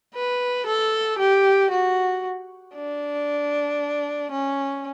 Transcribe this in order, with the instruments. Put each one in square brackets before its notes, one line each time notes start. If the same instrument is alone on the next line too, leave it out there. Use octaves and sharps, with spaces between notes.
[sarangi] B4
A4
G4
F#4
D4
C#4